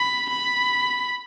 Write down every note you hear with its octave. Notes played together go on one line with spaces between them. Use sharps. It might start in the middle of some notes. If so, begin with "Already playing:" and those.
Already playing: B5
B5